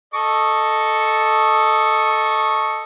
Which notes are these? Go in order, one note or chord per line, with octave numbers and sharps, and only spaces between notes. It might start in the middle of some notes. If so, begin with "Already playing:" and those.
A4 D#5 C#6